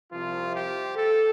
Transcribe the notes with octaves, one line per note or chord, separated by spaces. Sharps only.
C2 C3 F3 F4
G4
A4